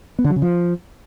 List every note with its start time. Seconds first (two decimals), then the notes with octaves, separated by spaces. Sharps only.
0.19 B3
0.24 D3
0.30 F#3
0.36 C#3
0.42 F3